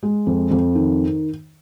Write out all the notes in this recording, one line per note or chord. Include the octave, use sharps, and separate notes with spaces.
G#3
F2
F2
D#3